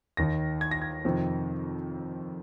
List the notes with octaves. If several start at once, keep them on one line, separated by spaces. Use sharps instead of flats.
D#2 D#3 A#6
G#6
A#6
G#6
F2 C3 D#3